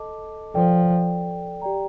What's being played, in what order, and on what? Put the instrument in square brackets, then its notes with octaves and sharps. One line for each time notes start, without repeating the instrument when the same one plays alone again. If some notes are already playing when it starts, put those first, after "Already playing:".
Already playing: [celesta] A4 D#5 A5 D6
[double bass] F3 [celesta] A4 D5 G5
[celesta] G4 D5 G5 A#5